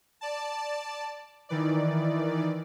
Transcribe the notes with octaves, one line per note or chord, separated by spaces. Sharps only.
D5 A5
D#3 E3 D5